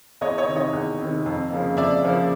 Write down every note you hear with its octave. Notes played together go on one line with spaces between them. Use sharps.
E2 C#5 D#5
C#5 D#5
C3 D#3
C#5 D#5
E2
C3 D#3
F2
C#3 F3 A#3
F2 D5 E5
C#3 F3 A#3